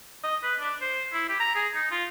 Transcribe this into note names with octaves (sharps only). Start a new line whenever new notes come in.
D#5
B4
D4
C5
E4
G4
A#5
G#4
D#4
F4